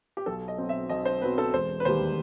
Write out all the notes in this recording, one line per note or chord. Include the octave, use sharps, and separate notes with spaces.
G4
B1 A4
D#5
B2 F#3 C4
E5
B1 D#5
C5
B2 F#3 C4 B4
A4
E1 C5
B4
D#2 D#3 G3 C5